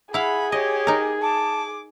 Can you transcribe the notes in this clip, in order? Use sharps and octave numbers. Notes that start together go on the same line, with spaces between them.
E4 G#4 F5 F#5 B5
G4 C#5 D#5
D#4 A#4
A5 D6